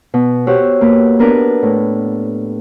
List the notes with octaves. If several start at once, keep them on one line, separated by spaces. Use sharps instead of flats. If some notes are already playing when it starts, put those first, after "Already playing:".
B2
F#4 G4 C5 C#5 F#5 E6
A#3 B4
B3 D4 A#4 B4
A2